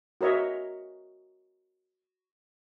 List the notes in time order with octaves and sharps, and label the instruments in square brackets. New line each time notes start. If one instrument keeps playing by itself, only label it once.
[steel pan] F#4 A#4 C#5 D#5 E5